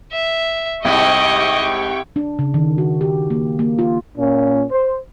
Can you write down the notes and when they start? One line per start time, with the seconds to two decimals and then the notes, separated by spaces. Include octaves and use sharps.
0.12 E5
0.85 C2 G#2 G3 E4 G4 D#5 G5 C#6
2.16 D4
2.39 C#3
2.54 D#3
2.78 F#4
3.01 G4
3.30 A#3
3.59 A#3
3.79 F4
4.18 A#2 C#4
4.71 C5